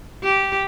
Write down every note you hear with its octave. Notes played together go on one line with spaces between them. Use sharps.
G4